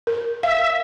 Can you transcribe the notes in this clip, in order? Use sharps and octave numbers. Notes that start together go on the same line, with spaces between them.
A#4
E5 F5